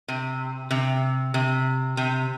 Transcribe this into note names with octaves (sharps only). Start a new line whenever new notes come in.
C3
C3
C3
C3